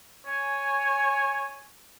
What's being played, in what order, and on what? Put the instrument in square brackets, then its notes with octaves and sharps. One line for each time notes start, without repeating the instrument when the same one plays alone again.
[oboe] C#5 [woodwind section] G#5